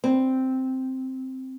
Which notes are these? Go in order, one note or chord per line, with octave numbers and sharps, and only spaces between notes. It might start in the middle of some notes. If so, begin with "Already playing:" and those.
C4